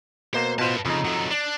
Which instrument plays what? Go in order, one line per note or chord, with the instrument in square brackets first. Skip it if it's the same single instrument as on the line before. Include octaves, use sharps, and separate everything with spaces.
[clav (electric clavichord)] B2 A#3 [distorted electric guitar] C5
[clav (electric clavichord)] B2 F4 C5 [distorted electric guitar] B4 A5
[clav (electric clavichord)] F2 D#4 [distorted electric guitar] C#3
[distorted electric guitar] F#3 A3
D4